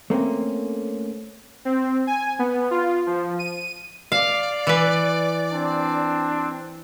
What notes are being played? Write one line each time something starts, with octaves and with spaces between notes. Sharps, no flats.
A3 A#3 C4 C#4
C4
G#5
B3
F4
F3
D#7
D5 F5
E3 B4
C4 D4